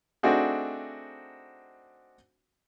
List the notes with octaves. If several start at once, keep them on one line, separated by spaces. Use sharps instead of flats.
A3 C4 D4 D#4 F#4 G#4